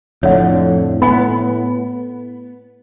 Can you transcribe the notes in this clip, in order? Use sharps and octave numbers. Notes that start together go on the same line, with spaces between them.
F2 A2 D3 C#5 F#5
B3 G#5 B5